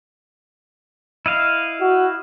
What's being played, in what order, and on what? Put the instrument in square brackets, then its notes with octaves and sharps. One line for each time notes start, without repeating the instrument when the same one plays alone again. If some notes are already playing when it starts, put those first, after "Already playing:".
[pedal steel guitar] E4 D#5 F5
[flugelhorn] F#4